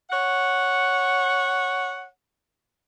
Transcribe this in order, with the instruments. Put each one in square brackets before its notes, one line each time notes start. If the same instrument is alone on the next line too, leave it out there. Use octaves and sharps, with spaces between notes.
[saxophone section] C#5 F#5